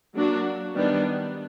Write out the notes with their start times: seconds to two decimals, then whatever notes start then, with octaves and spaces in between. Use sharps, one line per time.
0.14 F#3 A#3 D4 F#4
0.75 D#3 G3 B3 D4